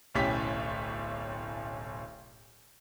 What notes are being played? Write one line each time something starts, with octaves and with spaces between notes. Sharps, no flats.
D1 B1 A2 C#4 G4 B6